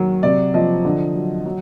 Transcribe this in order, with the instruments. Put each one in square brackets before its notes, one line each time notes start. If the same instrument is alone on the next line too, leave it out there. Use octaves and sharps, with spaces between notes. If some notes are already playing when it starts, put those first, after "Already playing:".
Already playing: [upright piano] D#3 F#3
C3 D5
F3 D#5
D3
F#3
F#3